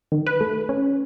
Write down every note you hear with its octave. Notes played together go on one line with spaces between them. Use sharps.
D#3
B4
A3
C#4